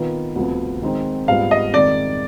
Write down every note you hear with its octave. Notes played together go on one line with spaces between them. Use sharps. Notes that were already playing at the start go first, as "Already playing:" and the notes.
Already playing: D#3 B3 F4 B4
D2 C3 F3 B3
D#3 G#3 C4 D#4
G#2 G3 B3 F4 B4 F5
D#5
F2 D#3 G#3 D5